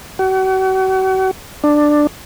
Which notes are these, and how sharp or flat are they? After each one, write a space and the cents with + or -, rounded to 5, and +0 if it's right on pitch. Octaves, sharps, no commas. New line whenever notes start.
F#4 +40
D4 +10